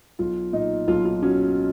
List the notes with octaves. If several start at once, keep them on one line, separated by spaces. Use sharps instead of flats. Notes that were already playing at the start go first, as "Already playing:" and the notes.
B1 F4
A#2 D#4
B1 F4
F4
F#3 C#4